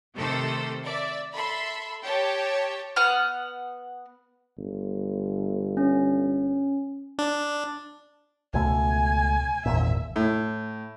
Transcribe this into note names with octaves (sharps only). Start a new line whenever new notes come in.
C3 D#3 A3 G4 A4 C5
D5 E5
A4 E5 B5 C6
G4 C#5 G5 A5
B3 F#5 F6
G1
C#4
D4
C#2 B2 A3 G#5
G#1 E2 A#2 E5
A2